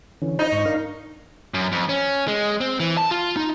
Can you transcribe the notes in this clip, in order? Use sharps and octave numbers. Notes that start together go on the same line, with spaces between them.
D3 E3 C#4
D#4 F4 C5 G6
G#2 C#6
D4 A#4 F5
F#2
F2
C#4
G#3
C4
E3
A5
F4
D#4